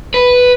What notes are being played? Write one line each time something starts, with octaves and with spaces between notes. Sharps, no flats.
B4